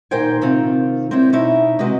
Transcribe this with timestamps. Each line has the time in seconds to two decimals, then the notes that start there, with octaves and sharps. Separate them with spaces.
0.11 A#2 D#3 A#4 C5 G5 G#5
0.41 C3 D#3 C4 F4
1.11 C4 D4 E4 C5 C#5
1.33 B2 C#4 D#4 E4 E5
1.79 C3 G#3 F#4 G4 B4 D#5